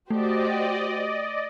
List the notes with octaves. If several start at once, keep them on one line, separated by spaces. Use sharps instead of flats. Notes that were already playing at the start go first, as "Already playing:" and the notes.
A3 F#4 G4 C5 D5 D#5